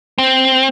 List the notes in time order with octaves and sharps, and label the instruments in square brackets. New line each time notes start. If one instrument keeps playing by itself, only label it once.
[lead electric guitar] C4